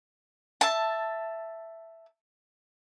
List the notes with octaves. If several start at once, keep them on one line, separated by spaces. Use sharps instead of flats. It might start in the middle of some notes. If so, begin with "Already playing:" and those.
E5 A5